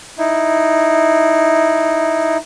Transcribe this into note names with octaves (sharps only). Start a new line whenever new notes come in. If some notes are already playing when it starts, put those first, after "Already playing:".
D#4 E4